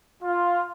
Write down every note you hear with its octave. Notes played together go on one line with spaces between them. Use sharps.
F4